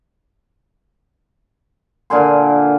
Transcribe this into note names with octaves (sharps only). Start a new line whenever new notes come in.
A#2 D3 G#5 C6